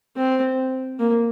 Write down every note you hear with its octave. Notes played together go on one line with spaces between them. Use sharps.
C4
A#3